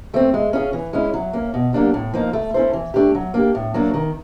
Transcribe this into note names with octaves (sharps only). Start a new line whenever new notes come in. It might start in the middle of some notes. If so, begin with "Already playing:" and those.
F3 A3 C4
G#3
C#4 F4 G#4
E3
G#3 C#4 E4
F#3
A#3 C#4
B2
F#3 A#3 D4 G4
A2
F3 A#3 D#4
A3
C#4 E4 A4 C5
E3
A3 D4 G4
F#3
A#3 D4 G4
A2
F#3 A#3 D4
D#3